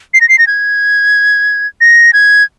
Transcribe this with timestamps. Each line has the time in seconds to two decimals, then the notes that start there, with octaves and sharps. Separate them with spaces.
0.14 C7
0.21 A#6
0.29 C7
0.38 A#6
0.47 G#6
1.81 A#6
2.13 G#6